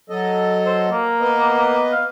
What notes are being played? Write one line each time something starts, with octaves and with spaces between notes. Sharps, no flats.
F#3 A4 D#5
C5
A#3
B3 B4 D#5
F5